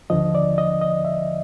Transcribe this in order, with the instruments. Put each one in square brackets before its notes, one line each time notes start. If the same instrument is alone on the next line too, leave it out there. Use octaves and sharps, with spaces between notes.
[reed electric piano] D#2 D3 F3 D#5
D5
D#5
D#5
E5